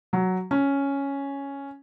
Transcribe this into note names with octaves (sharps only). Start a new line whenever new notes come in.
F#3
C#4